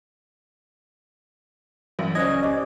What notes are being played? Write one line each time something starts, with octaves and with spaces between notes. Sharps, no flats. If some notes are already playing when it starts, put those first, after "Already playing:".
A1 G2 E3 F#3 A#4
C#2 C#4 E4 C5 D5 D#5 G#6
G4 D5 D#5 D6